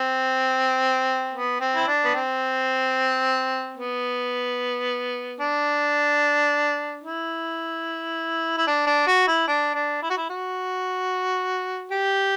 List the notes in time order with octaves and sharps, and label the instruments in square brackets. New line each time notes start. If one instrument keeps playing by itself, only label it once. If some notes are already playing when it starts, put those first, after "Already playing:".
Already playing: [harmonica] C4
B3
C4
E4
D4
B3
C4
B3
D4
E4
E4
D4
D4
F#4
E4
D4
D4
E4
F#4
E4
F#4
G4